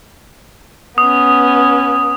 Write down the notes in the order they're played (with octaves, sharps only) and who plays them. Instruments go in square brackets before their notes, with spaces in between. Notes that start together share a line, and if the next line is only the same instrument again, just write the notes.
[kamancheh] B3 C#4 [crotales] D#6